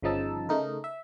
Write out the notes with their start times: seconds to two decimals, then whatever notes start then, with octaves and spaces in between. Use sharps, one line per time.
0.02 G1 C#3 F3 D#4 A5 E6
0.49 C#3 A3 D#4 A#4
0.84 E5